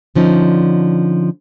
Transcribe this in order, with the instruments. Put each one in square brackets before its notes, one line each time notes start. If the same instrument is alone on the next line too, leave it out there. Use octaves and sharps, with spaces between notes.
[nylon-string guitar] D3 F3 C#4 D#4